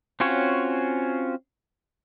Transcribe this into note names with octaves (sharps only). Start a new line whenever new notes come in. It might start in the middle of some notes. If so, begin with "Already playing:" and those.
C4 C#4 F4 F#4 C#5